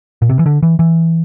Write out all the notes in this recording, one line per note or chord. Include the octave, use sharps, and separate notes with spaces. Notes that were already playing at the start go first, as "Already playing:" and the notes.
A#2
C3
E3
D3
E3
E3